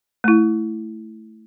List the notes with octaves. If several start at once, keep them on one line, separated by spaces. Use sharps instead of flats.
A3 E4